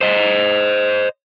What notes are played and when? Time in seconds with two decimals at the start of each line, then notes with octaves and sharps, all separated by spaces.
0.01 C5 D#5